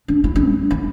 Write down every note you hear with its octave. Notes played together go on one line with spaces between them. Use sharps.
D4
E4
D4
G3
E4